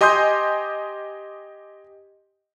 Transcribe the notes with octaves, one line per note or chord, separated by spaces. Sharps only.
G4 D#5 G#5 C6 D#6 G6